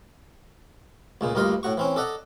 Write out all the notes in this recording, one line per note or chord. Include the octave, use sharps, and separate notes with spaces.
C#2 A#2 G#3
D2 G2 A#3 F4 D#5
A2 F#4 C#6
E3 C4 C#4
A4 D5 D#5 F#5 A#5